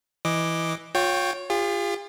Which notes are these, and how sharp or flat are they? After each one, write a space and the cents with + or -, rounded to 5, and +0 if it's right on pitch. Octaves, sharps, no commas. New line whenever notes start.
E3 +0 D#5 +0 D6 +0
F4 +40 C#5 +0 G5 +0
F4 +0 G#4 -45